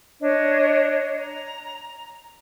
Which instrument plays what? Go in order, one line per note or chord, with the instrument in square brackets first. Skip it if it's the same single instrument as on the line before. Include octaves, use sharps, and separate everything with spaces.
[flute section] D4 C#5 D#5
A#5